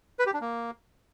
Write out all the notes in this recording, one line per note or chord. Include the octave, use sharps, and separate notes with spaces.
B4
G4
D4
A#3